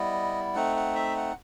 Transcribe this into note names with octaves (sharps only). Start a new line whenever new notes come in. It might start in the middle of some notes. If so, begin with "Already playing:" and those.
Already playing: G3 B3 E4 D#5
A3 C4 D#4 F#5
F#5
E5
F#5